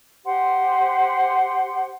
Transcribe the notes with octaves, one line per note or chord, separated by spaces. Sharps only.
G4 C5 F#5 C6